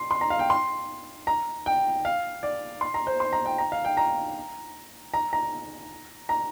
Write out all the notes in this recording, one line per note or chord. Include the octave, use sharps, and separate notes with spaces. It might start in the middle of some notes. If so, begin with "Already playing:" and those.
Already playing: C6
C6
A#5
F5
G5
C6
A#5
G5
F5
D5
C6
A#5
C5
C6
A#5
G5
A#5
F5
G5
A#5
A#5
A#5
A#5